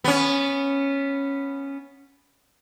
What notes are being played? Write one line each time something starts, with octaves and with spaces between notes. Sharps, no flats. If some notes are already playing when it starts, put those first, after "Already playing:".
B3 C#4